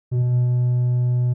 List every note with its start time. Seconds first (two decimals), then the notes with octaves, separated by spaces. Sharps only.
0.11 B2